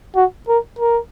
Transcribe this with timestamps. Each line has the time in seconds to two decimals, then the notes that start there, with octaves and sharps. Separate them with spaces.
0.15 F#4
0.48 A#4
0.79 A#4